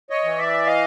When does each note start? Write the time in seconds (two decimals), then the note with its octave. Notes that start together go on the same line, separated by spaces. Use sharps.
0.10 C#5 D#5
0.24 E3
0.38 D5 E5
0.66 D#5 F5